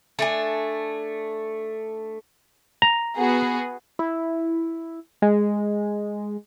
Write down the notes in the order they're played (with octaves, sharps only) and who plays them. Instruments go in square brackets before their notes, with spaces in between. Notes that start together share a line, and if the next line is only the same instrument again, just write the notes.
[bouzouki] A3 D4 G#5
[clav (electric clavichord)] A#5
[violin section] B3 F#4 G#4
[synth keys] E4
G#3